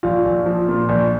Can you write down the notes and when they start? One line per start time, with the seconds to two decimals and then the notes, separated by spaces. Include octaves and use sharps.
0.03 A#1 F4
0.25 A#1
0.46 F3
0.68 A#2
0.89 A#1